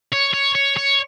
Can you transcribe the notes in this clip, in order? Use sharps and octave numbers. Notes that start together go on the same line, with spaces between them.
C#5
C#5
C#5
C#5